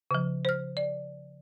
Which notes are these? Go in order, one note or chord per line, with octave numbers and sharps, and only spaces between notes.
C#3 F3
C5 F6
D5